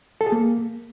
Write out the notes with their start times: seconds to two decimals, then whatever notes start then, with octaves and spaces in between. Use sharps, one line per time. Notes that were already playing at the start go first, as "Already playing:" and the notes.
0.21 A4
0.26 G#4
0.32 A#3